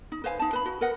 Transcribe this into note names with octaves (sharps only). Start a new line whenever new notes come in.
D#4
B4 C5 F5 G#5
D#4 A5
B4 B5
F#4
A#4 B4 D#5 F#5